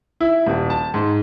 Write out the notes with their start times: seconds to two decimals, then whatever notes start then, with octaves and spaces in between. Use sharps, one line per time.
0.21 E4
0.47 D#1
0.70 A5
0.94 G#2